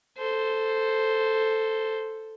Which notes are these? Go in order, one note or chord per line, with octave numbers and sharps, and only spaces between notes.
A4 C5